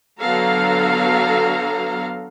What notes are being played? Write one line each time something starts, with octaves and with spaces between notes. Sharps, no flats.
D3 F#3 B3 A4 F5 A#5